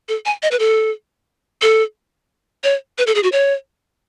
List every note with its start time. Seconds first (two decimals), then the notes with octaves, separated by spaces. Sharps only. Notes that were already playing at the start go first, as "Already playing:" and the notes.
0.09 A4
0.26 G#5
0.43 D#5
0.51 B4
0.59 A4
1.62 A4
2.64 C#5
2.98 B4
3.07 A4
3.15 G#4
3.23 F#4
3.32 C#5